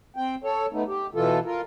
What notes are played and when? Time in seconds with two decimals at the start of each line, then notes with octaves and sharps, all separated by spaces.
0.16 C4 G5
0.44 A4 C#5
0.73 A3 B3 D#4
0.87 G4
1.15 B2 E3 F4 A4
1.45 F4 A#4